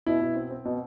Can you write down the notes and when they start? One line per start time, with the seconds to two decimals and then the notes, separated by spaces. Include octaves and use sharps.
0.06 B2 E4
0.21 B2
0.35 C4
0.51 C4
0.65 B2